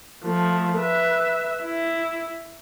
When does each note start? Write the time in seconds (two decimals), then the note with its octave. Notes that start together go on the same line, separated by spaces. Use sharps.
0.25 F3 A3
0.78 B4 E5
1.63 E4